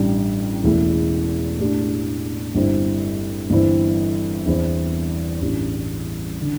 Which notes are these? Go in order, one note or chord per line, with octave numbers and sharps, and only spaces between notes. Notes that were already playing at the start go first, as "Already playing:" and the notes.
Already playing: A1 G2 G3 D4
E1 E2 E3 A3 E4
A2 A3 D4 G4
G1 G2 G3 C4 E4
G1 G2 E3 C4 E4
E2 E3 C4
A1 G2 E3 G3
D3